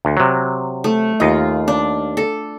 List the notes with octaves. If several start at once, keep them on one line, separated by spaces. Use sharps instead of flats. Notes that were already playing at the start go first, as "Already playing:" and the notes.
D2
C3 F#3
A3
D#2 F4 D#5
D4
A4